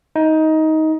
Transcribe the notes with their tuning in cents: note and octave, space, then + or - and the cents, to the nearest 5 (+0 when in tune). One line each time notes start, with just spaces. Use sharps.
D#4 +15